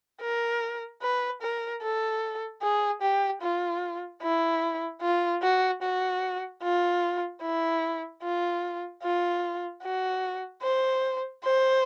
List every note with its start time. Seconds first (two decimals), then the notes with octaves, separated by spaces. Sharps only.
0.21 A#4
1.02 B4
1.42 A#4
1.82 A4
2.62 G#4
3.02 G4
3.42 F4
4.22 E4
5.01 F4
5.42 F#4
5.82 F#4
6.63 F4
7.42 E4
8.22 F4
9.02 F4
9.82 F#4
10.62 C5
11.44 C5